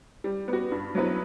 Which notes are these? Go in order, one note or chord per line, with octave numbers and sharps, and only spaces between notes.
G3
B3
F#4
G2
F#3 B3 E4 B4